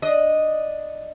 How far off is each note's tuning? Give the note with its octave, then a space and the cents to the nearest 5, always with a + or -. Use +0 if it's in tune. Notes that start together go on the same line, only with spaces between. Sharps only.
D4 +5 D#5 +0